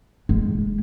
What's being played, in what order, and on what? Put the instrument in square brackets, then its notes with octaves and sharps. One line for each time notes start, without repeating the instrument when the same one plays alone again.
[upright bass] G#3